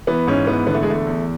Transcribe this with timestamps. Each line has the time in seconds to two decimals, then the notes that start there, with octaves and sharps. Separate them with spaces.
0.07 E3 B3
0.27 G#2 C#4
0.47 E3 B3
0.67 D3 B3
0.74 A3
0.83 G#3
0.87 E2 A3
1.07 E2